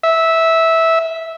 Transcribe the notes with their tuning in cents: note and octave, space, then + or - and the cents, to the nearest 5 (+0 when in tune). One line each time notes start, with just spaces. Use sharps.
E5 -15